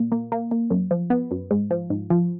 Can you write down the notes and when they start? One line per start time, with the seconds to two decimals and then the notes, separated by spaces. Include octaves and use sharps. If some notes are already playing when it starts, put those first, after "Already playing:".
Already playing: A#2
0.12 A#3
0.32 A#3
0.51 A#3
0.70 F#2
0.91 F3
1.10 B3
1.31 F#2
1.51 G#2
1.71 F3
1.90 G#2
2.10 F3